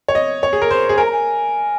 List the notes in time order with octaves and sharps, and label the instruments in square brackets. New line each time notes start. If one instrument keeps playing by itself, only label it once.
[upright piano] C#5
D#5
C#5
G#4
A#4
C5
G#4
[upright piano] A#4 [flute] G#5
[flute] A#5
G#5